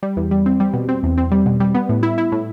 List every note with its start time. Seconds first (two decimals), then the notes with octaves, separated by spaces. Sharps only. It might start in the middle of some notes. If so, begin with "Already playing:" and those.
0.03 G3
0.17 E2
0.31 G3
0.46 C4
0.60 G3
0.74 B2
0.89 C4
1.03 E2
1.18 C4
1.31 G3
1.46 B2
1.60 G3
1.75 B3
1.89 A2
2.03 E4
2.18 E4
2.32 A2